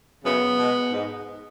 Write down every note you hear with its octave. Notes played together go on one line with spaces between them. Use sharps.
F#2 C#3 F#3 B3
B2 G#3
G#2 G#3